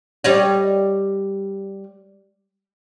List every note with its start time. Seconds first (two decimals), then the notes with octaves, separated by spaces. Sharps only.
0.24 G3 C#5 D#5